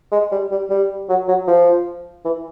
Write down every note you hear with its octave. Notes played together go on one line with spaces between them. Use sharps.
G#3
G3
G3
G3
F#3
F#3
F3
E3